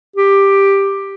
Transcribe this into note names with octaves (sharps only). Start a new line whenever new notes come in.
G4